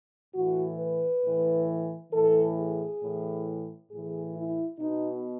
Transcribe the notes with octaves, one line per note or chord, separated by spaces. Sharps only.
A2 E3 F#4
B4
A2 E3
A2 E3 A4
G#4
A2 E3
A2 E3 G#4
E4
B2 D#4